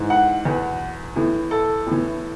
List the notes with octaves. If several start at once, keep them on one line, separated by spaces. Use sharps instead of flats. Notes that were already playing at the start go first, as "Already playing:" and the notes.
Already playing: G#2 E3
F#5
E2 B2
A2 E3
A4
A2 E3